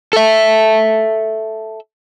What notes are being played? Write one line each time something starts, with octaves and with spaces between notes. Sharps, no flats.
A4 E5